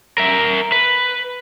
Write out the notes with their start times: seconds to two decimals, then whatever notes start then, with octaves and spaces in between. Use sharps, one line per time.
0.18 A#4 E5
0.72 B4